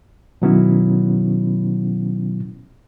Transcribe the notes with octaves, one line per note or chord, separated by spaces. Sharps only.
B2 D#3 F#3 B3 C#4 E4